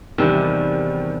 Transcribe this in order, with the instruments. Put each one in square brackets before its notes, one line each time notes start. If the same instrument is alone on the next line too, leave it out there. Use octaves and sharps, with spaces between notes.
[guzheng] E2 C3 D4 [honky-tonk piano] D#3 G3